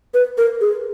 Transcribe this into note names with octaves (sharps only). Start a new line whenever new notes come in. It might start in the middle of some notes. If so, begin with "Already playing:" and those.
B4
A#4
G#4